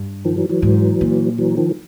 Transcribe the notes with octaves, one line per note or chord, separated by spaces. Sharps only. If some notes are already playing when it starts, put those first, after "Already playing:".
Already playing: G2
D#3 F3
E3 F#3
E3 F#3
G#2
A#2
E3 F#3
D#3 F3